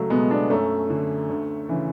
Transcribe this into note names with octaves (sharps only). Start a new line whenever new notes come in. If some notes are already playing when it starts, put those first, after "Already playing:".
Already playing: C#2 F#3 A3
B2 G#3 B3
B3 D4
F#2 A3 C#4
D3
D2
C#3 E3